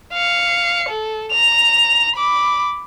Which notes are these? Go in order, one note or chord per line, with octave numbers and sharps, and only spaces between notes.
F5 C#7
A4
A#5 F7
B5 D6